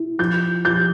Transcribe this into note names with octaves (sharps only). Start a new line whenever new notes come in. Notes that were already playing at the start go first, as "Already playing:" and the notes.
Already playing: E4
F3 G6
F3 G6